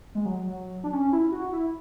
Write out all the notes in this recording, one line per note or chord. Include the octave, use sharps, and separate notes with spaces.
G#3
F#3
F#3
D4
C#4
E4
F#4
E4